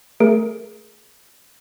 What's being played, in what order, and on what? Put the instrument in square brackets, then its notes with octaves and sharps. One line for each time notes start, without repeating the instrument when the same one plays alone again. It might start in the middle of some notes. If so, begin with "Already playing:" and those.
[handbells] A3 G#4 A#4 D7